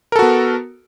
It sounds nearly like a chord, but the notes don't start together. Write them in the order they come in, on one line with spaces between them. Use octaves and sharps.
A#4 A4 F#4 B3